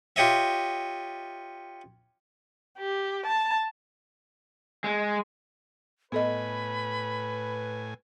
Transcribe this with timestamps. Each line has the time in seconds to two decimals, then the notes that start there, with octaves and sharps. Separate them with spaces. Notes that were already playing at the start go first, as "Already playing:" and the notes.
0.16 F4 G4 C#5 D#5 E5
2.79 G4
3.26 A5
4.84 G#3
6.12 A2 B3 A4 B4 D#5 G#5 B5